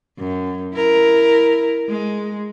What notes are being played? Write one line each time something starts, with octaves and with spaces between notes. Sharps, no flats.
F#2
E4 A#4
G#3